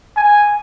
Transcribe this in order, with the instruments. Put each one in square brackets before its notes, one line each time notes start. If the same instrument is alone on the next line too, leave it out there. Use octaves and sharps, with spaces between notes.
[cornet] G#5